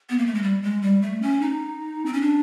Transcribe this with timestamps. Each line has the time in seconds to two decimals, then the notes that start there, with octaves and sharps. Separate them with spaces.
0.10 B3
0.18 A#3
0.26 A3
0.34 G#3
0.42 G3
0.62 G#3
0.82 G3
1.02 A3
1.22 C#4
1.41 D#4
2.06 C4
2.13 C#4
2.21 D4